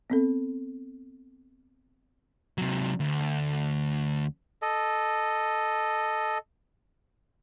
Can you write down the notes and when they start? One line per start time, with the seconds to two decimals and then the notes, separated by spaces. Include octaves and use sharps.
0.10 B3 C4 A4
2.58 C3 F#3
3.00 D2
4.62 A4 D#5